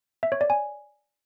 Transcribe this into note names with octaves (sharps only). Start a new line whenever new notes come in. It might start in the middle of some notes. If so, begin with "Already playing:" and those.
E5
C#5
D5
G#5